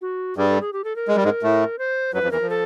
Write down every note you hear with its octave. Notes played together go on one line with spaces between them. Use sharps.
F#4
G2 G3 G#4
A4
G#4
G4
A4
A#4
G#3
G3
G#2 G#3
A2 A3
C5
F#2 F#3 B4
F2 F3
E2 E3 A#4
F3
A4